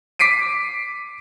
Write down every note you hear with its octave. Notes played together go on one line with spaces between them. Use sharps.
D6 B6 C7 D7 D#7